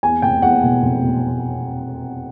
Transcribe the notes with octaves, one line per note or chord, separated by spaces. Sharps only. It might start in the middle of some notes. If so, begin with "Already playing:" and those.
E2 G#5
F1 G5
E2 F#5
B2
F1
B2